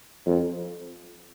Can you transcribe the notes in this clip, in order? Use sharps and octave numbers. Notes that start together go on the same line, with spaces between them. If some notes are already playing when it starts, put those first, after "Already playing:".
F2